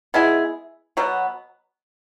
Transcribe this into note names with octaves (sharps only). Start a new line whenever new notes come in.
G#3 B3 E4 G#4
B2 F#3 B3